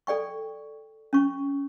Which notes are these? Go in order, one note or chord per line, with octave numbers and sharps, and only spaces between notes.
A4 D5 G5 C#6
C#4 C#6